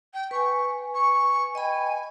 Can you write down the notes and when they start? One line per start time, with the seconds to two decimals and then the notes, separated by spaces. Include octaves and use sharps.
0.13 G5
0.31 B4 G#5 C#6
0.94 C#6
1.55 D#5 G5 G#5 B5